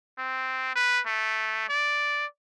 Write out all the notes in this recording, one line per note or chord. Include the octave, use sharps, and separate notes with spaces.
C4
B4
A3
D5